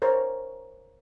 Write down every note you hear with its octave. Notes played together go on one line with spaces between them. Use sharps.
A#4 C5 C#5